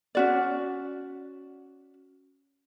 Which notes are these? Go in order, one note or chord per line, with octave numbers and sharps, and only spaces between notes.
C#4 F#4 D5